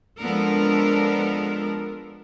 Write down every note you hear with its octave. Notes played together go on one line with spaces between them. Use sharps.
F3 G#3 B3 D4 A4 A#4